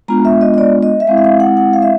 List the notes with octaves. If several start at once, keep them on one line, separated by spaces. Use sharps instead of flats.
G#3 B3 D4 F4 A#5
E5
D#5
D#5
D5
D#5
E5
G#3 C4 E4 F5
E5
F5
F#5
F#5
F5
E5